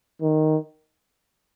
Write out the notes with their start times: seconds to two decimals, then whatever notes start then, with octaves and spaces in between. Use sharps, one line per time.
0.22 D#3